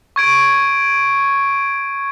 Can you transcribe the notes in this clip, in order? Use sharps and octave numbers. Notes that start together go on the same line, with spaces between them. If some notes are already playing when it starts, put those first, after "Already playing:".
C#6 G#6 D7